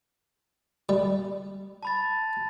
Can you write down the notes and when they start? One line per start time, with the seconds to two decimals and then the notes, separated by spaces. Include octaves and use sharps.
0.89 G3
1.83 A5 B5 A6